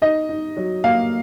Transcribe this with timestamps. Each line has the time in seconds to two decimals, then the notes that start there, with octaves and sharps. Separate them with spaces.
0.02 D#4 D#5
0.29 D#4
0.57 F#3
0.84 A#3 F5